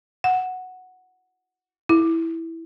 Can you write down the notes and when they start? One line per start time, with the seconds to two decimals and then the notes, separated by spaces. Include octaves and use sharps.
0.24 F#5
1.89 E4